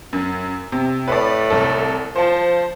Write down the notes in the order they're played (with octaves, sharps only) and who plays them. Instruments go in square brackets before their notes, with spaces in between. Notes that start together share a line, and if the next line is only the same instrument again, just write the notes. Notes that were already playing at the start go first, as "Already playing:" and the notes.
[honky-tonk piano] F#2
C3
[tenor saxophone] A2 [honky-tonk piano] B4 D5
[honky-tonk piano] C2 A4
[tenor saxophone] F3 [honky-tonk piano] C5 A5